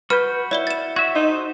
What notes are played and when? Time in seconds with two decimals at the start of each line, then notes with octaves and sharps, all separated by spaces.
0.10 F#4 B4 F6 G6
0.51 E4 C#5 D5 G7
0.67 A6 E7
0.96 F#4 E5 G#6
1.15 D#4 F#4 A4 C5